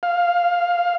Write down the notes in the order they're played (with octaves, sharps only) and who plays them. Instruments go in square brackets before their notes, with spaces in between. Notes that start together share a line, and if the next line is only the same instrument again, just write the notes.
[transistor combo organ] F5